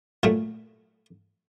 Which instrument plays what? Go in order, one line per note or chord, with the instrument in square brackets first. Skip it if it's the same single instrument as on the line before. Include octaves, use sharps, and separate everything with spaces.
[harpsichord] A#2 F#3 A3 E4